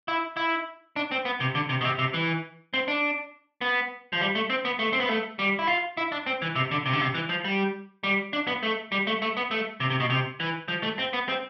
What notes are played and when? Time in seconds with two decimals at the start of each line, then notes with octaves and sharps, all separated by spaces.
0.08 E4
0.37 E4
0.96 D4
1.11 C4
1.25 B3
1.40 C3
1.55 D3
1.69 C3
1.81 B2
1.85 C3
1.99 C3
2.14 E3
2.74 C4
2.88 D4
3.61 B3
4.13 F3
4.21 G3
4.35 A3
4.50 C4
4.65 B3
4.79 A3
4.93 C4
5.00 B3
5.09 A3
5.39 G3
5.59 E4
5.67 F4
5.97 E4
6.12 D4
6.26 C4
6.42 E3
6.56 C3
6.71 D3
6.86 C3
6.93 D3
7.01 C3
7.15 E3
7.29 F3
7.45 G3
8.04 G3
8.33 D4
8.47 B3
8.63 A3
8.92 G3
9.07 A3
9.22 A3
9.37 B3
9.51 A3
9.80 C3
9.90 C3
10.00 B2
10.10 C3
10.40 E3
10.68 F3
10.83 A3
10.99 C4
11.13 B3
11.28 C4